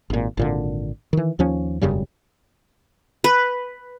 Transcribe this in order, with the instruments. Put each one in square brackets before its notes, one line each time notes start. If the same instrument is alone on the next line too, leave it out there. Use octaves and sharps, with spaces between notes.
[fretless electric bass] G#1 A#2
G#1 A#2 D3
D#3 E3
D#2 F3 C#4
E1 F#2 C#3 G3
[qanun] B4